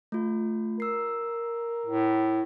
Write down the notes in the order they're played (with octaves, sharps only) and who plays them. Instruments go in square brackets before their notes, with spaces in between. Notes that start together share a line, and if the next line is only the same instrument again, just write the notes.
[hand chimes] A3 F4
[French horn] A#4 [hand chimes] E6 C7
[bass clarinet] A2